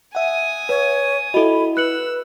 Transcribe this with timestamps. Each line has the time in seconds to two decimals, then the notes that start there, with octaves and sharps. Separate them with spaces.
0.15 E5 F#5 G#5 D#6
0.69 B4 C#5
1.34 E4 F#4 A4 D#5 B5
1.77 B4 E6 F#6 C#7 F#7